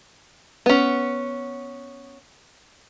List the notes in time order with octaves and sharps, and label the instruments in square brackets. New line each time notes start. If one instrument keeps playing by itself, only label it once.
[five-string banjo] B3 C#4